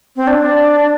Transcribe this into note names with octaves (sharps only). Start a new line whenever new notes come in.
C4
D4